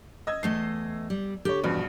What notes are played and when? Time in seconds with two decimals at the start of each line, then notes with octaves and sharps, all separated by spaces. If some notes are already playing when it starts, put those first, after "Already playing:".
0.27 D#5 E6 G#6
0.43 E2 A3 D#5 C7
1.10 G3
1.45 D3 G4 C#5
1.64 A#1 E2 G2 B2